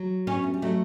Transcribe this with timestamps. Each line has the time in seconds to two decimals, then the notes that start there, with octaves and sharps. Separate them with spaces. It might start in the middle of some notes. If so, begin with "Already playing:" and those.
Already playing: F#3
0.27 C#4
0.34 B3
0.43 A3
0.54 G3
0.62 F#3 A3